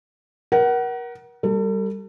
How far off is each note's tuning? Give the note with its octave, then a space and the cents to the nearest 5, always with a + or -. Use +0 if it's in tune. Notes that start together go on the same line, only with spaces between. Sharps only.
A#4 +30 F#5 +25
G3 +0 A4 +40